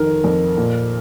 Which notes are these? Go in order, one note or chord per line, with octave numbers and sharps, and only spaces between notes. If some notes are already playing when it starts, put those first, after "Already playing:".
Already playing: F2 D#3 A#4
F2
A#2